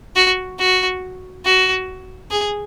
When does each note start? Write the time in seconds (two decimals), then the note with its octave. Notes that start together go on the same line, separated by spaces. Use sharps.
0.16 F#4
0.59 F#4
1.45 F#4
2.31 G#4